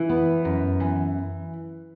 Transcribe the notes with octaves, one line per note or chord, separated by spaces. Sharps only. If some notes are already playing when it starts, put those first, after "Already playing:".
Already playing: E3
B3
F#2
E3